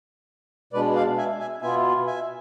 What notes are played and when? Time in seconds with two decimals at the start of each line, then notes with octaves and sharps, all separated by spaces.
0.73 B2 G#3 D4 B4 D5
0.96 D5 F5
1.18 E5 G#5
1.40 E5 G#5
1.62 B2 B3 F4 E5 G#5
2.06 E5 G#5